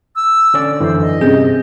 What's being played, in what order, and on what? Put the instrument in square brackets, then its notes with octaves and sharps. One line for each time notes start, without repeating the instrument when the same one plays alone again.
[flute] E6
[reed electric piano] D3 C#4 D5
[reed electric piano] F#2 D3 E3 [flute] C5
[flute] D#5
[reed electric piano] G2 C3 G6 [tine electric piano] C4 C#4 G#4